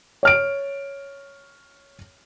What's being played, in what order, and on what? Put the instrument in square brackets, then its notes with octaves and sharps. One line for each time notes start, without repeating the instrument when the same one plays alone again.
[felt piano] C#5 F6 D7